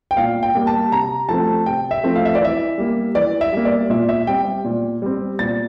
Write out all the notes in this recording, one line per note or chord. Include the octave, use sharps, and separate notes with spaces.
G5
A#2 F5
G5
G3 A#3
A5
C3 A#5
F3 A3 C4 A5
C3 G5
E5
F3 A3 C4
F5
E5
D5
E3 E5
G3 A#3
E3 D5
E5
G3 A#3
D5
A#2 E5
E5
G3 C4 G5
A#2
G3 C4
A#2 A6